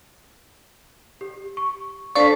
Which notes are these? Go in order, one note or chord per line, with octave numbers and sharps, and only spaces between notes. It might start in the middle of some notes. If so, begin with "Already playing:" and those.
G4
C#6
D4 A4 C5 D5 F5 A5 C#6 B6